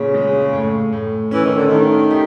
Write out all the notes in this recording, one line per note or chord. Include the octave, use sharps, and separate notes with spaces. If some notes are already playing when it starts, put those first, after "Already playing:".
Already playing: A#2 C#3
G#3
A2
A2
E3 C#4
D#3
D3
D#3 A3
G4